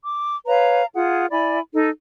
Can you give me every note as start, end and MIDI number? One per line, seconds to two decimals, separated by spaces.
0.03 0.35 86
0.46 0.84 71
0.46 0.84 73
0.46 0.84 77
0.46 0.84 82
0.94 1.26 65
0.94 1.26 68
0.94 1.26 78
1.31 1.59 64
1.31 1.59 74
1.31 1.59 80
1.31 1.59 83
1.75 1.89 63
1.75 1.89 69